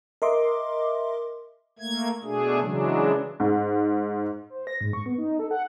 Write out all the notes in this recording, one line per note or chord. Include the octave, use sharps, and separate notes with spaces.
A#4 D#5 E5 C6 D6
A3 A#3 G#6
B2 A3 D4 G#4
C#3 E3 F#3 G#3 D4
G#2
C5
A#6
G#2
C#6
B3
D#4
A4
F#5